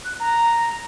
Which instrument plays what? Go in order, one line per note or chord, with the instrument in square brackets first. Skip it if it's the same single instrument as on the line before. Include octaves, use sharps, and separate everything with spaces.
[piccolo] F#6
A#5